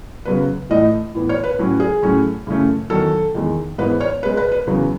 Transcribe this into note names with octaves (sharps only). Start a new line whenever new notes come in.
C#3 F#3 B3 B4
A2 E3 A3 D#5
A2 E3 B3
C#5
B4
A2 F#3 C#4
G#4
A2 F#3 A3 C#4
F#2 C#3 E3 A3 C#4
E2 D#3 F#3 A4
E2 D#3 G#3
G#2 E3 B3 B4
C#5
B2 G#3 B3 B4
B4
B4
E2 C#3 F#3 B3